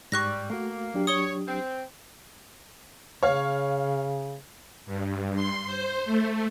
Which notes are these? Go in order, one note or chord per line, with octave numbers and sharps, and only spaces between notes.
G#2 G3 C#6 F#6 A#6
A3 A#3 F#4
F#3 D4 G4
C#5 D#6 G7
C4
C#3 C#5 F5
G2
C6
C5
A3